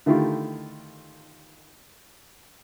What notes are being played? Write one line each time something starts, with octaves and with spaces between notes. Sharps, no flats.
D3 D#3 A3 E4 F4 G4